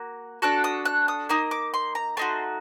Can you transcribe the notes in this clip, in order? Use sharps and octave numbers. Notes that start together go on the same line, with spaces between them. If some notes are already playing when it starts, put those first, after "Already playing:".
Already playing: A#3 F#4
D4 F#4 A4 F#6
D#6
F#6
D#6
A#3 D#4 D#6
D6
C6
A#5
A3 D#4 F#4 C6